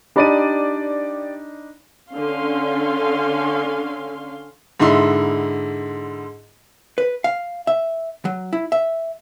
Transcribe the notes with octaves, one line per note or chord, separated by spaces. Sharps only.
D4 D#4 G4 D5 B5 D#7
D3 C#4 F5 C6
G#2 D3 D#4 E4 C6
B4
F5
E5
F#3
E4
E5